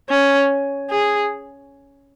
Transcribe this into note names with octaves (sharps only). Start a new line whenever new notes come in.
C#4
G#4